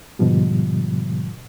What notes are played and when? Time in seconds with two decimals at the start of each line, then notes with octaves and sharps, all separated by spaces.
0.19 G#2 B2 D3 F3 G3